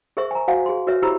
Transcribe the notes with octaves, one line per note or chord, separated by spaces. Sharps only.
G#4 A#4 C5 E5 C#6
G#5 A#5
F#4 C5 F5 F#5 G#5
G#4 C6
F#4 A#4 B4 C#5 E5
E4 G4 C5 A#5 B5 E6